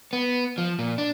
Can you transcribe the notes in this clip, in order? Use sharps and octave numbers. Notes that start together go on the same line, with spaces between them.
B3
F3
A#2
D4